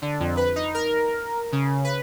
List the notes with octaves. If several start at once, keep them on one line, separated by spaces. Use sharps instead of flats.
D3
F2
B4
D#4
A#4
C#3
B4